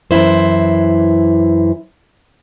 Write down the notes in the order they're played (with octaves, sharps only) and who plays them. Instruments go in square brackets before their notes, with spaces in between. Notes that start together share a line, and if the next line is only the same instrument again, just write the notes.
[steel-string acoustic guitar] F#2 E3 E4 C5